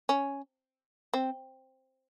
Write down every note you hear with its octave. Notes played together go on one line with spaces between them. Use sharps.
C#4
C4